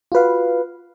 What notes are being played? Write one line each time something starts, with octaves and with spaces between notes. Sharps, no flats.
F4 F#4 B4 F5